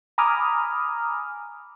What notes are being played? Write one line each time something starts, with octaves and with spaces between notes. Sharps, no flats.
G#5 A#5 B5 D6 D#6 F6